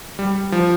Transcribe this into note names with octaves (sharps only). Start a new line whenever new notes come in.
G3
F3